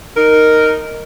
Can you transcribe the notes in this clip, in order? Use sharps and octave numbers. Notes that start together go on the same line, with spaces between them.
D#4 A#4